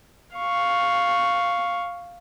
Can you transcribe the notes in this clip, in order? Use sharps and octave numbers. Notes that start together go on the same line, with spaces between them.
F5 C#6